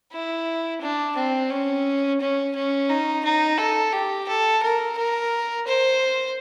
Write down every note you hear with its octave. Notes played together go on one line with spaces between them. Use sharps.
E4
D4
C4
C#4
C#4
C#4
D#4
D#4
A4
G4
A4
A#4
A#4
C5